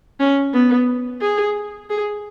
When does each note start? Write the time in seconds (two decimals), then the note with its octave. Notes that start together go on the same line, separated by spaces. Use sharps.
0.20 C#4
0.53 B3
1.21 G#4
1.90 G#4